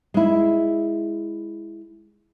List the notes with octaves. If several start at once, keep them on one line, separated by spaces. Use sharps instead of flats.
G#3 E4